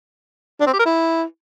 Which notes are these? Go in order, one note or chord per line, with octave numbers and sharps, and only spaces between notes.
D4
C4
G4
A#4
E4